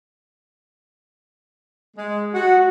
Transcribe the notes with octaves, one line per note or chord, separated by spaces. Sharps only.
G#3
F#4